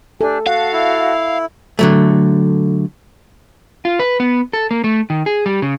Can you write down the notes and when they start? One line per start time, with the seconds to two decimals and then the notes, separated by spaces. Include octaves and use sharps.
0.21 D4 G4 A4 G#5
0.47 F#4 A4 F5 F#5
0.73 E4
1.79 D3 F#3 A3
3.85 F4
4.00 B4
4.20 B3
4.53 A4
4.71 A#3
4.84 A3
5.10 D#3
5.26 G#4
5.46 G3
5.62 C#3